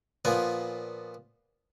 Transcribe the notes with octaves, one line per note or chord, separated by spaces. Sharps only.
A#2 F3 B3 G#5